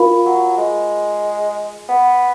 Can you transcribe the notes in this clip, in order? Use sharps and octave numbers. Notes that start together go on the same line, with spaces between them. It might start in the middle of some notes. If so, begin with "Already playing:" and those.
Already playing: F4 A#4 F5 B5
F#3
G#3
B3